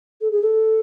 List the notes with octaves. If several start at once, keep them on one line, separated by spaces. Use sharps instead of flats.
A4
G#4
A4